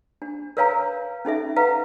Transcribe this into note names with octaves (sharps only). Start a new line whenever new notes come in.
D4
A#4 B4 C#5 F5 G#5 A#5
C#4 D#4 A4 E5
B4 F5 F#5 A#5